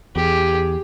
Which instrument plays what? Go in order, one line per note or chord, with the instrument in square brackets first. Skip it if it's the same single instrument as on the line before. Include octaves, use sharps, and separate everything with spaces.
[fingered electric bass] E2 [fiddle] G4 G#4